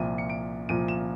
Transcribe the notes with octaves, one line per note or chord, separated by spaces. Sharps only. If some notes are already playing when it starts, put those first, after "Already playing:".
Already playing: C2 A#2 F3 D#7
C#7
D7
C2 A#2 F3 D#7
E7